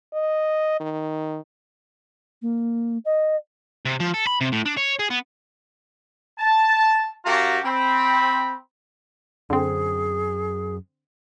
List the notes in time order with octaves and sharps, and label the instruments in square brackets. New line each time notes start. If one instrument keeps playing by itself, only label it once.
[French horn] D#5
D#3
[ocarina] A#3
D#5
[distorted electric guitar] C3
F3
A4
B5
C3
A2
D4
C#5
G#4
B3
[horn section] A5
F#2 F#4 G4 F5 A5 A#5
C4 B5
[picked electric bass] F#2 [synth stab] D3 C4 [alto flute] G#4